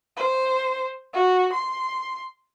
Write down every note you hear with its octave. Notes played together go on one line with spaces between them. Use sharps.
C5
F#4
C6